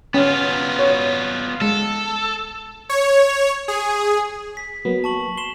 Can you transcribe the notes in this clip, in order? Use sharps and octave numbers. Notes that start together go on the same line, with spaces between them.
B3 C#4 F4
C#5
G#3 A4
C#5
G#4
B6
F#3 A#3 B3
A5 C#6 F#7
C6 E7 G7